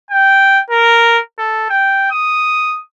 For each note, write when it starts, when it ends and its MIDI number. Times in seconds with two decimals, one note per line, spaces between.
0.11 0.60 79
0.70 1.19 70
1.39 1.67 69
1.70 2.08 79
2.11 2.80 87